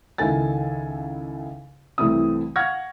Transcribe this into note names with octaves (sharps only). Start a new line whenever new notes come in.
C#2 D#3 E4 A4 G#5 A6
C2 E3 A3 C4 E4 D#6
F5 F#5 C#6 F6 G#6 A#6